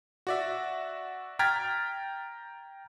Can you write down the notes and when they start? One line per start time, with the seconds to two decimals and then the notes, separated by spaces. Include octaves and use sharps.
0.27 F#4 D5 E5
1.39 G5 A#5 F6 G#6 A6 B6